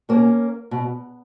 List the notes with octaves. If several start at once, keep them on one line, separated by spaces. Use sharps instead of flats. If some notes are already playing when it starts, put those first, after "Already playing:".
B2 A#3 C#4
B2